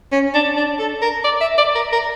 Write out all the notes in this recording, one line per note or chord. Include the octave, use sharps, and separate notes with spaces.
C#4
D4
D4
A4
A#4
D5
E5
D5
A#4
A#4